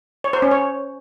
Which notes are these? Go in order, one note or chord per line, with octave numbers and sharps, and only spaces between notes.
C#5
C5
C#4
C#5